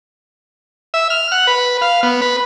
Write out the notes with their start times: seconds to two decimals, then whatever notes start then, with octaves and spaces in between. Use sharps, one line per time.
0.94 E5
1.10 F6
1.32 F#5
1.47 B4
1.82 F5
2.03 B3
2.21 B4